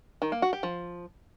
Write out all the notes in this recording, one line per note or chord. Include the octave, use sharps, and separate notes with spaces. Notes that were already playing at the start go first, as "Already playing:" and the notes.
D#3
A#3
F#4
G4
F3